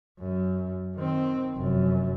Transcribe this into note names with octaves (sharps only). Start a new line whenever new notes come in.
F#2
D#3 C4
F1 F#2